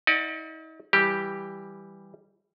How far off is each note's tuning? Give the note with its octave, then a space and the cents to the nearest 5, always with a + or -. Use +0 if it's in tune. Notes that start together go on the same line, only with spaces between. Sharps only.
D#4 +45 D5 +30 F#5 -35
E3 +0 G3 +0 G4 +0